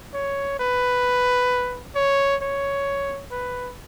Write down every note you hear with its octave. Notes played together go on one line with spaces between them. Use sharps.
C#5
B4
C#5
C#5
B4